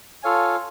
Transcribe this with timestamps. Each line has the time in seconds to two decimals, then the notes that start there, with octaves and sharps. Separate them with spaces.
0.23 F4 A4 C#5 F5 G#5